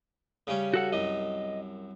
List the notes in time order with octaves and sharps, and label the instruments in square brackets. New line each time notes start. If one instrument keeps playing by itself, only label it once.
[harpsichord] C#3 G3 C#4
[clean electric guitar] F#4 A4 F#5
[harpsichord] C2 F#2 [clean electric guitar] D#5